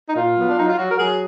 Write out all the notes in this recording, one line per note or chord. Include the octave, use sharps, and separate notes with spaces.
D#4
A#2 F4
F#3 B3
D4
F#3 D#4
F4
F#3 F#4
A#4
F#3 G#4